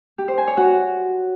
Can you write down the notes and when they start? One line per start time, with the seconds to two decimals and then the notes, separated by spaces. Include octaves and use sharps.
0.18 G4
0.28 C5
0.38 G#5
0.47 C#5
0.57 F#4